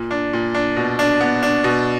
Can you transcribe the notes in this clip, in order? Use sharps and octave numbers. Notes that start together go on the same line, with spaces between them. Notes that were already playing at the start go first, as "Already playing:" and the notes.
Already playing: A#2
D4
A#2
D4
B2
D4
B3
D4
B2